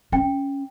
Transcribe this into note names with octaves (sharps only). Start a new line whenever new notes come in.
C#4 G5